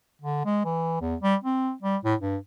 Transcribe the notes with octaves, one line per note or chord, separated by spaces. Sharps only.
D3
G#3
E3
E2
G3
C4
G3
A2
G2